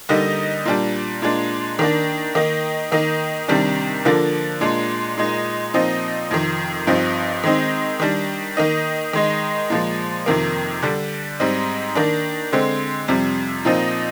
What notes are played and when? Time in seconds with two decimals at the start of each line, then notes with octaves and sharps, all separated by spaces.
0.09 D3 G3 A#3 D#4
0.65 A#2 G3 D4
1.22 A#2 G#3 D4
1.79 D#3 A#3 D4
2.35 D#3 A#3 D#4
2.92 D#3 A#3 D#4
3.48 C3 D#3 G3 D4
4.05 D3 F3 A#3 D4
4.61 A#2 G#3 D4
5.18 A#2 G#3 D#4
5.74 A#2 F3 C4 D#4
6.31 F2 C3 D#3
6.87 G2 F3 C4 D#4
7.44 D#3 G#3 C4 D#4
8.00 D#3 G3 D4
8.57 D#3 A#3 D#4
9.13 D#3 G#3 D#4
9.70 A#2 F3 G#3
10.26 F2 C3 D#3 A#3
10.82 D3 G3 D4
11.40 G#2 G3 C4 D#4
11.95 D#3 A#3 D4
12.52 D3 G#3 C4
13.08 F2 C3 G3
13.65 A#2 F3 C4 D#4